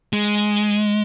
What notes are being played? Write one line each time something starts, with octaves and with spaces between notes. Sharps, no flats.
G#3